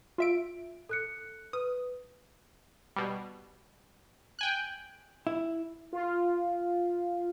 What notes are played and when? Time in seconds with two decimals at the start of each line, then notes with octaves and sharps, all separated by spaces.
0.18 F4 E5 D7
0.89 A4 F#6 C#7
1.53 B4 D#6
2.96 B2 G3
4.39 G5 G#5 F#6
5.27 E4
5.93 F4